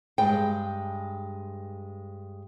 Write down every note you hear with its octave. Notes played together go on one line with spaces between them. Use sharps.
G2 G#3 G5